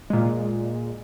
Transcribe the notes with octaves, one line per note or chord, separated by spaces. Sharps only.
A#2 G#3